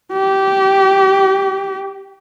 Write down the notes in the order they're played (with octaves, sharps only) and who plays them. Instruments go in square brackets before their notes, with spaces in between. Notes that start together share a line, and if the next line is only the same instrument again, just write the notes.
[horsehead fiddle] G4